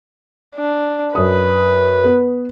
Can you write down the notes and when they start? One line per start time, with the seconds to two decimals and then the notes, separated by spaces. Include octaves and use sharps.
0.56 D4
1.15 F#2 B4 D#6
2.04 B3